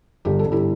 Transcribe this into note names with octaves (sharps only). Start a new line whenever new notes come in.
G1 G4
A4
G1
E4 G4